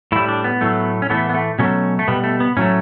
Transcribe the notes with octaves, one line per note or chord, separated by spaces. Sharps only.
A2 G3 E4
D4
B3
A2 F#3 A3
C#4
A2 E3 A3 B3
B3
A3
B2 F#3 A3 C#4
A3
B2 G3 B3
A3
B3
A2 F#3 A3 C#4